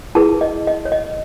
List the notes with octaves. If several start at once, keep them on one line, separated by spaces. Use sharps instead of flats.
E4 G#4 B4 A5
D#5
D#5
C#5
D#5